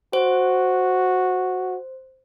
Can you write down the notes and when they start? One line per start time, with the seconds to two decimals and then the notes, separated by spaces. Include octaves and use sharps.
0.13 F#4 C5